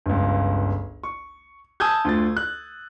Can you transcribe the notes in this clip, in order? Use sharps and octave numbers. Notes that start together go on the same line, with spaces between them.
G1 C#2
C#6
G#5 A5 D#6 E6 G6 G#6
D2 F4 A6
F#6